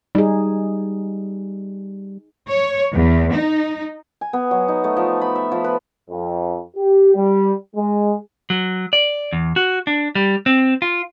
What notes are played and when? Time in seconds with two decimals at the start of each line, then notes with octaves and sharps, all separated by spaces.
0.15 G3 D#4 G#4
2.49 C#5
2.94 E2
3.33 D#4
4.21 G#5
4.33 B3
4.51 F#3
4.68 D#4
4.84 A3
4.97 F3
5.21 B5
5.35 E5
5.52 F3
5.64 B4
6.10 F2
6.76 G4
7.15 G3
7.76 G#3
8.50 F#3
8.93 D5
9.33 E2
9.56 F#4
9.87 D4
10.15 G3
10.46 C4
10.82 F4